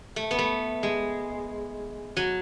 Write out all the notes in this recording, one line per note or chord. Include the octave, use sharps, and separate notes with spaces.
A3
B3
A3
G#3
F#3